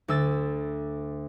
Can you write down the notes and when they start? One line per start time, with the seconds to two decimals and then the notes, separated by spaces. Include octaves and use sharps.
0.08 D2 E6 A6